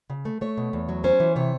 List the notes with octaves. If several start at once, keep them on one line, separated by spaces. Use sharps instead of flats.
C#3
A3
A3 C#5
B2
E2
F#3
C#4 C5
E3
C3 C#5